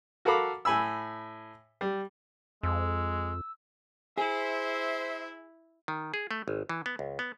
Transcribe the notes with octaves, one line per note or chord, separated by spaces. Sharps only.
F#4 A4 A#4 F5 B5 D6
A2 G#5 B5 E6
G3
F2 G#3 E6
E4 G#4 C5 E5
D#3
G#4
A3
G#1
E3
B3
C#2
B3